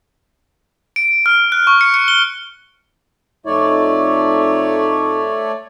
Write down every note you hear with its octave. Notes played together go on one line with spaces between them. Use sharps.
D7
F6
F#6
C#6
C#7
C#7
G7
F2 A3 D#4 C#5 D5